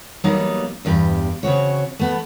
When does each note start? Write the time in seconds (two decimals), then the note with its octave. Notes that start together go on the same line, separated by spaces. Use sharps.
0.24 F#3 G3 A#3 B3 D#4
0.85 E2 G2 G4
1.43 C#3 C4 F#4 C#5
1.99 A3 B3